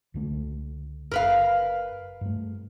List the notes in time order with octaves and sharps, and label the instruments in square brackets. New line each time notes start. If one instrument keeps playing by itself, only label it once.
[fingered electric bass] C#2 D3 A3
[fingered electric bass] F#1 [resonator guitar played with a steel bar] A#4 B4 F5
[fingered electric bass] G2 A3